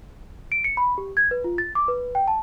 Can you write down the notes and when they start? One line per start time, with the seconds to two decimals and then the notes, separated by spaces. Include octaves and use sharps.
0.52 D7
0.64 C#7
0.77 B5
0.98 G4
1.17 G#6
1.31 B4
1.44 F4
1.58 A6
1.75 D6
1.88 B4
2.15 G5
2.28 A5